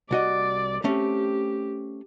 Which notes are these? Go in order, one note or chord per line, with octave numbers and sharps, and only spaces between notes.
C2 F#4 D5 D#5
A3 C4 C#4 G4